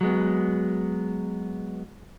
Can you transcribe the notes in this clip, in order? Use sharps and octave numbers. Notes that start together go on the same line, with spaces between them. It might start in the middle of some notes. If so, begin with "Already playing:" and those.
F#3 G#3 B3